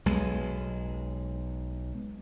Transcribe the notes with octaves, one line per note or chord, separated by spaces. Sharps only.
B1 G#3